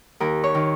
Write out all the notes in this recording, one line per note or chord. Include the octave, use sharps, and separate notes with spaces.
D#2 A#4
C#5
D#3